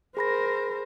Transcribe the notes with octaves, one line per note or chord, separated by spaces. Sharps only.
G#4 A#4 C5 B5 A#6